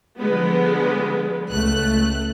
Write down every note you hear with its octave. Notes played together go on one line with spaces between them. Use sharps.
D3 F3 G3 G#3 B3
C#2 A3 F#6